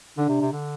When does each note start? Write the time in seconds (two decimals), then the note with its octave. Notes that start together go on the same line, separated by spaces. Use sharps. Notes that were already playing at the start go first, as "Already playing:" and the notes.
0.18 D3 D4
0.28 C3
0.41 C3
0.52 D3